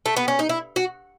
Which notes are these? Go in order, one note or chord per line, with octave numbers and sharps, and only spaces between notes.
A3
B3
C#4
D#4
E4
F#4